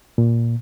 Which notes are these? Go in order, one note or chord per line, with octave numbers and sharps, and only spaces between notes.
A#2